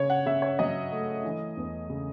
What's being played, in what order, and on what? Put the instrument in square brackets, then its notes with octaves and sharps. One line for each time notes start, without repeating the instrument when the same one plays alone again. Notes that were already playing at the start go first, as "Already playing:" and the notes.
Already playing: [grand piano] C#3 C#5
F#5
C#3 E5
C#5
F#3 D#5
A3
E3
E2
C#3